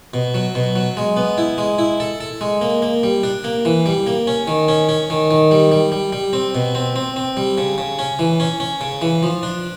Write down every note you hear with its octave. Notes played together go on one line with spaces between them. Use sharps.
B2
F#3
B2
F#3
G#3
B3
E4
G#3
E4
A4
A4
G#3
A#3
A#3
G3
D4
A#3
E3
G3
A#3
C#4
D#3
C#4
C#4
D#3
D#3
G3
G3
G3
G3
C4
B2
C4
C4
C4
G3
C#3
C#3
C#4
E3
C#4
C#4
C#3
E3
F3
D4